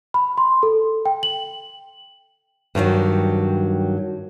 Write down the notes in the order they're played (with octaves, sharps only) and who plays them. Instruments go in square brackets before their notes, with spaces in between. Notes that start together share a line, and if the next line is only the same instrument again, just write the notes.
[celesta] B5
C6
A4
G5
F#7
[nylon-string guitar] G2 D#3 E3 F#3